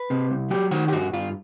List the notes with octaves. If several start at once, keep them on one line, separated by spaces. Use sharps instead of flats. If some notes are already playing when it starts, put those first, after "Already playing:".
Already playing: B4
C3
C2
F#3 G4
D#3 F#4
G4
G2 F#4
G2 F4